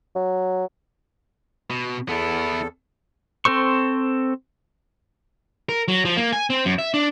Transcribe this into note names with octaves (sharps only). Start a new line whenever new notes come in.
F#3
B2
E2 B3 E4 A4
C4 A4 C5 C#6
A#4
F#3
F3
A#3
G#5
C4
F#2
E5
D4